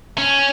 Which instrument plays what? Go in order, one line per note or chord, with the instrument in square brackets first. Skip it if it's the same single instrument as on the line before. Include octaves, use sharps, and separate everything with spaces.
[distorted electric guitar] C#4